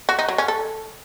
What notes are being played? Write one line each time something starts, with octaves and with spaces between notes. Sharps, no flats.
F#4
D#4
F#3
C#4
A4